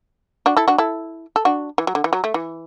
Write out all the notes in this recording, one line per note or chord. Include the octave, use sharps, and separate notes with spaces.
D4 F#4
E4 A4
D4 F#4
E4 A4
A4
D4 F#4
E3
F#3
D3
E3
F#3
A3
E3